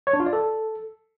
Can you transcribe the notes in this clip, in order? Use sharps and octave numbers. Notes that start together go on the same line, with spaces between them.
C#5
D4
F4
D5
A4